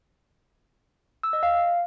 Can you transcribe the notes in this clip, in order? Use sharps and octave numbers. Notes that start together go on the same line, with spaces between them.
E6
D#5
F5